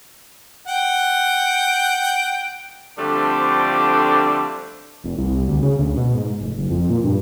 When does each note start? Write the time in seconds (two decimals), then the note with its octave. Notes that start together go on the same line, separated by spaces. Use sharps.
0.67 F#5 G5
2.98 D3 F3 G3 A3 C4 D4
5.04 F1
5.18 C2
5.47 D2
5.62 C#3
5.79 D2
5.97 B2
6.14 G#2
6.41 F1
6.58 F#1
6.70 F2
6.90 A#2
7.04 G2